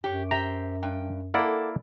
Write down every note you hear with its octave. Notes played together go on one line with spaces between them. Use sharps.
F#2 G4 C#5
G4 C5 E5 A#5
G2 G5
A#3 E4 A4 D5 F#5